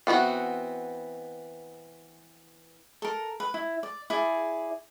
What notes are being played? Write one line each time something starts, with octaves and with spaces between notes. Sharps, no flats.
E3 B3 C4 F#4
A4 A#4
B4
E4
D5
E4 G#4 D5